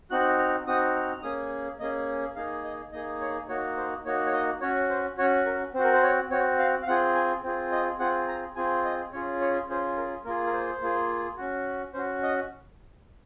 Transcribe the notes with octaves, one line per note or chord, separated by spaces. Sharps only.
C4 D#4 F#4 F#6
F6
C4 D#4 F#4 D#6
F6
F6
A#3 C#4 G#4 D#6
A#3 C#4 G#4 D#5
A#3 D#4 G#4 F5
D#5
A#3 D#4 G#4 D#5
C#5
A#3 D#4 F#4 C#5
C5
A#3 D#4 F#4 C#5
C#5
D#5
C#4 F#4 C#5
C5
C#4 F#4 C#5
A#4
C4 F#4 C5
A#4
C5
C#5
C4 F#4 C#5
F5
F5
C4 F4 G#4 F#5
G#5
C4 F4 G#4
D#5
C4 F4 G#4 F#5
A#5
C4 F4 G#4 G#5
D#5
C#4 F4 G#4 C#5
C#5
C#4 F4 G#4 C5
A#4
A#3 F4 G#4 A#4
A#4
C5
A#3 F4 G#4
C#4 F#4
C#4 F#4 C5
D#5